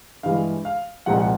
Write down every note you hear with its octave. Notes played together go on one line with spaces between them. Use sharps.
G2 E3 G#3 F5
F5
C2 A#2 F3 G#3 F#5
F#5